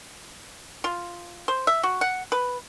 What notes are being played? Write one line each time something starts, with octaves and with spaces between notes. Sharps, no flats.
F4
C5
E5
F#4
F#5
B4